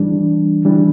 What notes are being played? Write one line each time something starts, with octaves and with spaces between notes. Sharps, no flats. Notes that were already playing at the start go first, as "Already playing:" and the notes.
Already playing: E3 G3 D4
E3 G3 D4